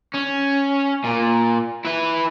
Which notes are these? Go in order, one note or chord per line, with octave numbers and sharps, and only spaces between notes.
C#4
A#2
E4 B4